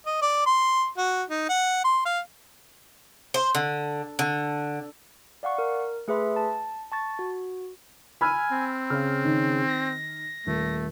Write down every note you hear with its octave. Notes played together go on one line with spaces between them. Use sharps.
D#5
D5
C6
F#4
D#4
F#5
C6
F5
C5
D3
D3
D5 F5 F#5 C#6
A#4
A3 G#4 B4 E5 C6
A5
A5 C#6 A6
F#4
G#5 B5 E6 F6
C4
C#3 F6
D#3
A#6
D#1 A3